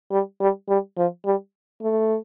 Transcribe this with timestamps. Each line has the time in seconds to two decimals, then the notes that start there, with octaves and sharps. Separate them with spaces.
0.11 G3
0.40 G3
0.68 G3
0.97 F3
1.25 G3
1.82 A3